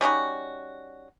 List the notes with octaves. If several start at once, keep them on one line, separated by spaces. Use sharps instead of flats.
G3 C#4 D#4 F#4